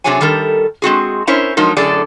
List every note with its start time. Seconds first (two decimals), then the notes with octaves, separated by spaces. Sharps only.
0.04 C3 F#3 D4 G#4 C#5 G#5
0.21 D#3 G3 A4 A#4
0.82 G#3 C4 F#4 G#4
1.27 C#4 E4 A#4 C5 C#5
1.57 F3 F#3 G#3 D#4 A#4
1.77 F#2 A2 D3 G#4 A4 D5